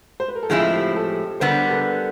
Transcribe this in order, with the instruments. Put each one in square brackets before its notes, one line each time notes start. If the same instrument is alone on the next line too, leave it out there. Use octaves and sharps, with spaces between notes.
[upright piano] C5
B4
A#4
A4
[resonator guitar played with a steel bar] A2 F3 G#3 C4 E4 [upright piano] G#4
[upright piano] G4 A4
G4 A4
[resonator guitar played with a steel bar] D3 G3 B3 [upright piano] A#4 C5
[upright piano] A#4
A4 B4